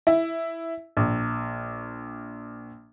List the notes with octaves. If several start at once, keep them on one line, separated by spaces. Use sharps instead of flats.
E4
A#1